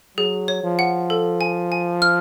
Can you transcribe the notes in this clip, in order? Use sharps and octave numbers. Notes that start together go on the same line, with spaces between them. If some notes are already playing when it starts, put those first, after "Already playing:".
F#3 G#4
C#5
F3
F#5
A4
G#5
G#5
F6